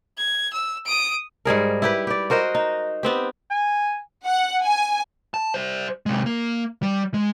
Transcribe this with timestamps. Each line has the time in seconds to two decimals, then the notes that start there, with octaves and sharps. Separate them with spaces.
0.18 G#6
0.53 E6
0.85 D#6 D7
1.45 G#2 G3 G#4 A#4
1.82 E4 G4 B4
2.07 G4 D5
2.30 F#4 A#4 C5 D#5
2.55 D#4
3.03 B3 C4 G4
3.51 G#5
4.26 F#5
4.64 G#5
5.34 A5
5.54 G3 C5
6.06 C3 G#3
6.26 A#3
6.82 G3
7.14 G#3